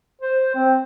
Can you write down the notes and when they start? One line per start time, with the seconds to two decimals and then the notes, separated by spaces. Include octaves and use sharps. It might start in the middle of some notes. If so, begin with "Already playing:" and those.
0.22 C5
0.55 C4